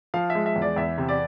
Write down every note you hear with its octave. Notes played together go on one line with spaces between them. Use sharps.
F3 F5
E5
G#3
E5
E2
D5
E2 E5
C3
D5